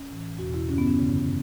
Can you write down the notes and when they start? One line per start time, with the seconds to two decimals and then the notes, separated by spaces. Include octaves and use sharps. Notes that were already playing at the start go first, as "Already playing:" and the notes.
Already playing: C#4
0.10 A2 E3
0.39 E2 B2 F#4
0.54 E4
0.68 G2 D3 C#4
0.78 B3
0.87 C#4
0.97 F#2 C#3 E3